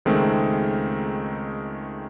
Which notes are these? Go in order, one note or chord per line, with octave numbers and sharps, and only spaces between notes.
C#2 D#3 G#3 A3 C4